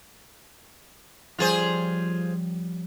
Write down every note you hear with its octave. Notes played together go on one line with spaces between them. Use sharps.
F3 G3 C#4 F4 G#4 C5